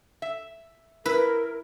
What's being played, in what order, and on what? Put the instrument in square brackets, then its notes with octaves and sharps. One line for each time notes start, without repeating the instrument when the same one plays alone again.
[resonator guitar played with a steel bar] E5
[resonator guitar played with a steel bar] E4 [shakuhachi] A#4 [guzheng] B4